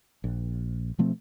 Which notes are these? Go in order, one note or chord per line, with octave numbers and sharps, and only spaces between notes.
A#1
B2 F3 A3 C4